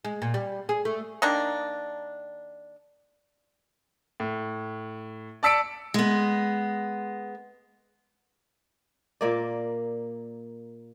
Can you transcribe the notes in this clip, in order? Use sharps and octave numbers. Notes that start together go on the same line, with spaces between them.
G#3
A#2
G3
G#4
A3
D#3 A#3 D4
A2
D5 A5 E6 B6 C#7 D7
G#3 B3
A#2 A#3 D5